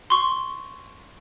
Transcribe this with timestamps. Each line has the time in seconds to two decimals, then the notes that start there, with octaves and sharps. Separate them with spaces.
0.10 C6 C#6